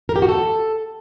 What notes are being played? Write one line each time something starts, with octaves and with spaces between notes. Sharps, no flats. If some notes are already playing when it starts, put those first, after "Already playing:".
A#4
G4
F#4
A4